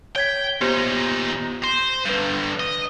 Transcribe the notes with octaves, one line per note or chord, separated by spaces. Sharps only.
C#5 G5 G#6 B6
A#2 B3 D#4 G4 C5
C5 A#6
G2 D3 B4 G6
D#5